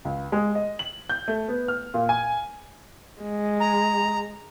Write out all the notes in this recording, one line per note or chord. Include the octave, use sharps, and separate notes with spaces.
C#2
G#3
D#5
F#7
G6
A3
B3
F6
A#2
G#5
G#3
A#5